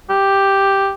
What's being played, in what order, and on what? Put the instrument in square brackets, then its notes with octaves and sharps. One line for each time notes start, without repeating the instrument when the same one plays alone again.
[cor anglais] G4